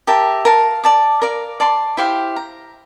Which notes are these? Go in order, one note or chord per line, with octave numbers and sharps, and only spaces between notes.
G4 A#4 E5 A5
A#4 F5 A5
D5 A5 D6
A#4 D5 F5
D5 A5 C6
E4 G4 C5 F5
A#5